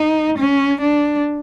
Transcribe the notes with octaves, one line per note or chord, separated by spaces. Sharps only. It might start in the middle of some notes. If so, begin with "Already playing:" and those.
Already playing: D#4
C#4
D4